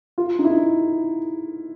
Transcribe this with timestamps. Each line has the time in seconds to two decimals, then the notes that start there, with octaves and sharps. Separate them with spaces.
0.18 F4
0.39 D#4
0.45 E4
0.50 D#4